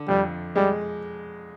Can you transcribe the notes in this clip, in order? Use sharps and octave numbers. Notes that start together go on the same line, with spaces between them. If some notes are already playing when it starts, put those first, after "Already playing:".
Already playing: D3
F2 G3
G3 G#3